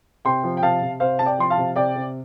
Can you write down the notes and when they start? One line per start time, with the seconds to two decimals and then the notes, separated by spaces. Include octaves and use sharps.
0.25 C3 G5 C6
0.44 F3
0.57 G5
0.62 C3 F5 A5
0.82 C3
1.00 C3 C5 F5
1.19 C3 A5
1.25 D5 G5
1.39 F3 C6
1.50 F5 A5
1.58 C3
1.75 C3 D5 G5
1.95 C3